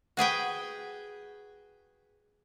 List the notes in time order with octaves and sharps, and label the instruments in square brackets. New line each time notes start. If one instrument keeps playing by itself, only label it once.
[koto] F#4 G#4 B4 G5